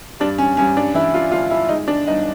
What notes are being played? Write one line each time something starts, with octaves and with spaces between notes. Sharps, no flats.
G2 D4
C#4
G2 C#4
D4
E3 E4
F4
G1 F4
E4
G#3 D#4
D4
G1 D#4